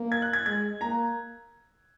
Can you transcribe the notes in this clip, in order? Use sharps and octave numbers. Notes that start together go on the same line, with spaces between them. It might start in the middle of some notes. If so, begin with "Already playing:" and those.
Already playing: A#3
G#6
F#6
G#6
G#3 G#6
A#3 A#5